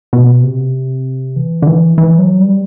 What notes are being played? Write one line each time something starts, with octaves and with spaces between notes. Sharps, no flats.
B2
C3
E3
D3
E3
E3
F#3
G3